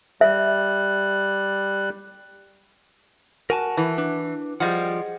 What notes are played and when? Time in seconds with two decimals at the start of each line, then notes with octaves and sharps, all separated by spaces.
0.21 G3 E5 F#6
3.50 F#4 A#4 G#5 A5
3.77 E3
3.98 D4 B4
4.60 F3 G3 G#4 D#5 F#5